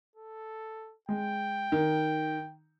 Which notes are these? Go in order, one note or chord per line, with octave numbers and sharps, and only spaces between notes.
A4
G#3 G5
D#3